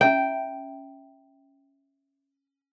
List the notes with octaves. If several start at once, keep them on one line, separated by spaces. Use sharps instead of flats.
C#4 E5 G5 A#5